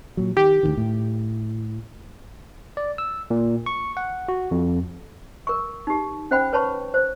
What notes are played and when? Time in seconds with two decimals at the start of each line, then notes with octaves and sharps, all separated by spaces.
0.17 A#2 F#3
0.37 D#3 G4
0.63 D2 D3 D#3
0.77 A2
2.77 D5
2.98 E6
3.30 A#2
3.66 C#6
3.97 F#5
4.28 F#4
4.51 F2
5.47 A#4 C#6
5.87 D#4 G4
6.31 C#4 C5 F#5 G5 B5
6.53 B4 C#5 A5 B5 C#6
6.94 C5